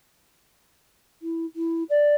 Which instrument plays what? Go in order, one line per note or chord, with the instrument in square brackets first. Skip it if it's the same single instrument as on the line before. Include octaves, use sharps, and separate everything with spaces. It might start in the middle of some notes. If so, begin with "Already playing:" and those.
[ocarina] E4
E4
D5